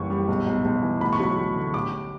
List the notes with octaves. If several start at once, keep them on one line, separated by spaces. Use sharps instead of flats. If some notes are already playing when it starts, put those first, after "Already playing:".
Already playing: F#1 E3 G3 C#6
G3
B1
B1
B1
E3
D2 B5
C#6
F#3 B5
D2
D3
A1 D6
A1